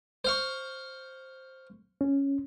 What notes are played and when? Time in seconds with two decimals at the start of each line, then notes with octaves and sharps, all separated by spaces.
0.25 C5 F5 C#6
2.01 C#4